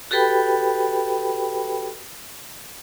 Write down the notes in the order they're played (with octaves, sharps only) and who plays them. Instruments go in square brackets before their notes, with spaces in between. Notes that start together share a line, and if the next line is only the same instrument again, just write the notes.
[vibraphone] F#4 G4 A4 B4 G5 B5